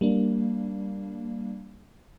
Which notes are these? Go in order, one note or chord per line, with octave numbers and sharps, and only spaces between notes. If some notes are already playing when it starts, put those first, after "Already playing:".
G3 A#3 D4